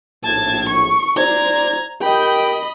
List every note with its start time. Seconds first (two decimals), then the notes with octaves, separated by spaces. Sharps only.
0.24 A#1 A2 A5 G#6
0.69 C#6
1.17 C5 D5 A#5 G#6
2.02 G4 A#4 D#5 G5 B5